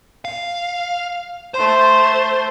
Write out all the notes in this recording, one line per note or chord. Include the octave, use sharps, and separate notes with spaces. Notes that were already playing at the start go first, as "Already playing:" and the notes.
F5
A3 C5 C6